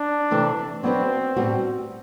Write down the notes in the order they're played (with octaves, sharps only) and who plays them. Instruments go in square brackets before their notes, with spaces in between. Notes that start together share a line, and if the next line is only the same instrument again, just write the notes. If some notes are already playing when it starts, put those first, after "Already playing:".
Already playing: [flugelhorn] D4
[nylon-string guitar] C3 E3 A3 C4
[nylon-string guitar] F#3 B3 D4 F#4 B4 [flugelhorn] C4
[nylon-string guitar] A2 G3 B3 F#4